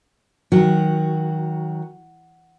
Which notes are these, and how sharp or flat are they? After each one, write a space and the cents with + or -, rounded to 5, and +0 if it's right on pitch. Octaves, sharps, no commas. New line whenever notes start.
D#3 +25 F#3 +0 F#4 +0